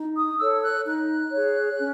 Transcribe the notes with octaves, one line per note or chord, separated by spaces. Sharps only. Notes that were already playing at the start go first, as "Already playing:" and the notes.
Already playing: D#4
D#6
A4 C#5 E6
F#6
D#4 F#6
G#4 C#5
C#4